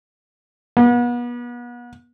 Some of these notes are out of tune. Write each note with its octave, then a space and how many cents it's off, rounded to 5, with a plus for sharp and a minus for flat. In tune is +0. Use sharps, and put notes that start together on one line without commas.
B3 -35